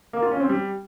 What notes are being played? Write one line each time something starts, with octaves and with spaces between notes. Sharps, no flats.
A#3
F4
C#4
C4
G3